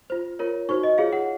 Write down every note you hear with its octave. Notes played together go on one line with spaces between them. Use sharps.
F4 C5
F4 A#4 C#5
D#4 F#4 C5 C#6
D#5
F4 G#4 C#5 F5
F#5